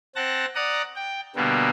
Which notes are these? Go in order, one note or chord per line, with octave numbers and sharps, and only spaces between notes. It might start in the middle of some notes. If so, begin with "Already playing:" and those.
C4 F#5 A5 A#6
D5 F#5 A#5 D#6
G5
B2 D3 G3 A#3 B3